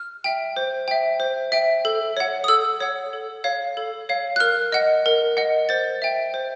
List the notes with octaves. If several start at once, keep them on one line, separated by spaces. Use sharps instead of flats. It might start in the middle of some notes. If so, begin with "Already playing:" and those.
Already playing: F6
E5 G5
C5
E5 G5
C5
E5 G5
A4
C#5 F#5
D#6
A4 E6
C#5 F#5
A4
C#5 F5
A4
C#5 F5
F#6
A#4 F6
D#5 F#5
A#4
D#5 F#5
C5 A6
E5 G5
C5